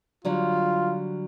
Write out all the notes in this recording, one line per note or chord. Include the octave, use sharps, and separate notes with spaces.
D3 F#3 G3 F4